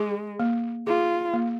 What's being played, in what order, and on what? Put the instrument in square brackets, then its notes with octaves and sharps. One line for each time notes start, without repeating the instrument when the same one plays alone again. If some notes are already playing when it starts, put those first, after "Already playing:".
Already playing: [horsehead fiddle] G#3 [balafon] G#4
[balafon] A#3
[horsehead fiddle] F4 [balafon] G#4
[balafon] A#3